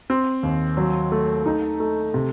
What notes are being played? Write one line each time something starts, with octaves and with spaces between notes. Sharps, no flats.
C4
D#2
F#3
A3
D#4
A3
C3